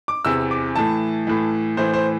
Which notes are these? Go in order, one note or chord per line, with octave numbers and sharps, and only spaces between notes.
D6
E2 C3 E3 E6
D6
A2 E3 A5
A2 E3
A2 E3 C5
C5